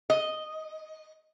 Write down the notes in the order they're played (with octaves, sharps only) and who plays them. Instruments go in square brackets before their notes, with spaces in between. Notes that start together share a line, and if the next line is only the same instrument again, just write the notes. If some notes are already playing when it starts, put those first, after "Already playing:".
[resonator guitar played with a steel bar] D#5